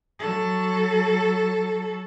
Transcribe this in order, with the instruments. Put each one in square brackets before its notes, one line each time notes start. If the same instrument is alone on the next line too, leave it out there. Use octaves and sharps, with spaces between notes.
[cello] F#3 A4